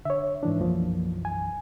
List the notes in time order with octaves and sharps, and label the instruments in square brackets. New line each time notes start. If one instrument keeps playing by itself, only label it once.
[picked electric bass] D3 [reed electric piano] C#5 E5
[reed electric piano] G#2 E3 D4
[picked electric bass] B1 F#2 E3 [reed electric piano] F3 A#3
[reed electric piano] G#5